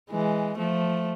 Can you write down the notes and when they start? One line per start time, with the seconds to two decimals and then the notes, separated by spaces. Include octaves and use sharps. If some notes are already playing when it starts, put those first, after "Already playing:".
0.11 E3 G#3
0.58 F3 A3